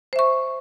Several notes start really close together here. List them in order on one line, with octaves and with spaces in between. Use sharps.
C5 E5 C#6